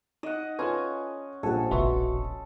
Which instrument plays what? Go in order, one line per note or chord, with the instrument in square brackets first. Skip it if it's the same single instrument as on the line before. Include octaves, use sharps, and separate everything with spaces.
[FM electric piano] D#4 [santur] D#5 F#5
[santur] C#4 [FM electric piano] F4 A4 B4 [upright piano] C6 G#6
[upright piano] A#1 F3 G3 [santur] A4 [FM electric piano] F#5 G#5
[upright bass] E1 A#1 [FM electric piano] F#4 B4 [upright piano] E5 C6 C#6